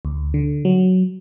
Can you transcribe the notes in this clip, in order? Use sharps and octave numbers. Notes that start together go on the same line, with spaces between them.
D2
D3
F#3